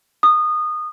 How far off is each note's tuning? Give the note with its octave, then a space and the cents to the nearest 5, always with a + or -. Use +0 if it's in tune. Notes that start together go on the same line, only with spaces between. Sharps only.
D#6 -20